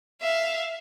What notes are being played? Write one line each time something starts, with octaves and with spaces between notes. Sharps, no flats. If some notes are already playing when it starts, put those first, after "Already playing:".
E5 F5